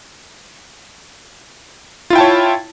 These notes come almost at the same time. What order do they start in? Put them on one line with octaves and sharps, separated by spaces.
F4 E4 G5 A5 C#5